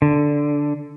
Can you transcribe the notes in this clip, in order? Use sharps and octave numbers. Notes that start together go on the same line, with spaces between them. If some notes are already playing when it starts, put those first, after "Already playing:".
D3